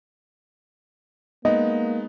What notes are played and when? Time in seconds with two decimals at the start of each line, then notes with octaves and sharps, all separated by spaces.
1.45 G#3 A#3 B3 D#4 D#5